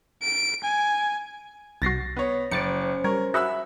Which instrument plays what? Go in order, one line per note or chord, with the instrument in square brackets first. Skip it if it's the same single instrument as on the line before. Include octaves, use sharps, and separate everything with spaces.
[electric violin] D7
G#5
[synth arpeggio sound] C2 F#4 [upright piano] A6 A#6 C7
[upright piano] B3 C#5
[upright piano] F#1 [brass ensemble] C#4 C5 [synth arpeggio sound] D6 A6 C#7
[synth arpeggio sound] G3 C#5 [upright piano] A#4
[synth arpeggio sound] F#4 G#4 F#5 [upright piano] E5 B5 E6